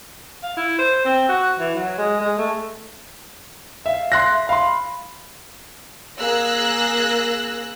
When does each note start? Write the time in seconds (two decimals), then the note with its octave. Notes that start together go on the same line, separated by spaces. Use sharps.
0.43 F5
0.57 E4
0.79 C5
1.05 C4
1.29 F#4
1.59 E3
1.75 F#3
1.98 G#3
2.20 G#3
2.38 A3
3.86 E5 F5
4.12 C6 F#6 A#6
4.32 E5
4.49 F5 B5 C6
6.18 A#3 G#4 E6 F#6 A#6